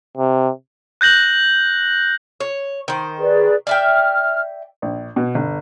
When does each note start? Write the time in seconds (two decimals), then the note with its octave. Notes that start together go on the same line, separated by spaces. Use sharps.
0.17 C3
1.01 F#6 G6 A#6 F#7
2.40 C#5
2.88 D#3 C5
3.19 G#4 B4 D5
3.67 D5 E5 G5 F6
4.82 A#1
5.16 B2
5.35 G1